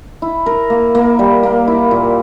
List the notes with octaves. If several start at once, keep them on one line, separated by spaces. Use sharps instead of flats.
E4
A#4
A#3
A#3
G3
A#3
E4
A#2